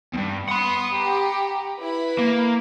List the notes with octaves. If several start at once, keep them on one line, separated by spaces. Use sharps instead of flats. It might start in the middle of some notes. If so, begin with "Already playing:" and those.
E2 G2
F#5 B5 C6 D#6
G4 A#5
E4 B4 B5
A#3